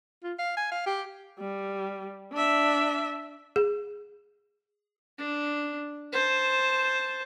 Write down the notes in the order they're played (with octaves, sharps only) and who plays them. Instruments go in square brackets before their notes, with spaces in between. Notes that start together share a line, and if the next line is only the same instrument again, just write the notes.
[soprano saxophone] F4
F5
G#5
F5
G4
[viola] G3
D4 E5
[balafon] G#4
[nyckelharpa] D4
C5 A5